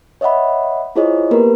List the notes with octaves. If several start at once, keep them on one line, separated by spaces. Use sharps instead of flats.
C#5 D#5 E5 F#5 B5
E4 F4 G#4 C5 C#5 D#5
A#3 B3 G4 A#4 B4